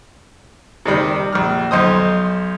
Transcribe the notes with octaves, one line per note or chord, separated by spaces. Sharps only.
C3 D#3 G3
A#1 F6
B1 D#4 C5 D#6